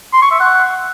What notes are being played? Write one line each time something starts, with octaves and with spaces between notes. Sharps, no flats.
C6
C#6
E5
F#5